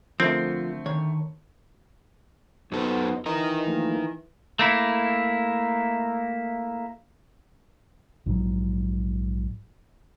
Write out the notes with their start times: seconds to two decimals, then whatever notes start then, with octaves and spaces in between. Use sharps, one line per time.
0.20 D3 F3 A3 C4 A#4 C5
0.86 D#3 C#5
2.72 F#2 B3 D#4 F#4 A4 C5
3.26 E3 D#4 A#4 D#5 A#5
3.67 F3 A3 A#3
4.59 A3 A#3 E4
8.26 A#1 G#2 B2 F#3